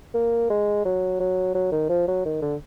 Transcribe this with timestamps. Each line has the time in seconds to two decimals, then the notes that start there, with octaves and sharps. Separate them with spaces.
0.14 A#3
0.50 G#3
0.85 F#3
1.20 F#3
1.55 F#3
1.72 D#3
1.89 F3
2.08 F#3
2.25 D#3
2.42 D3